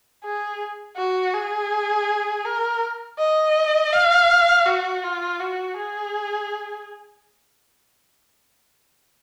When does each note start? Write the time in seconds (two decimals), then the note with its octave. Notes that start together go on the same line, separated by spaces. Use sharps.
0.24 G#4
0.97 F#4
1.34 G#4
2.45 A#4
3.19 D#5
3.93 F5
4.66 F#4
5.03 F4
5.40 F#4
5.77 G#4